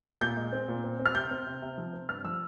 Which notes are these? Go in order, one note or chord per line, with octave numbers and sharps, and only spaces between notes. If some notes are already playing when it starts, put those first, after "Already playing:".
A#2 G6
G#3
C4
A#2
C4
C4
F6
C3 G6
C4
C3
C3
F3
C4
G2 F6
F3 E6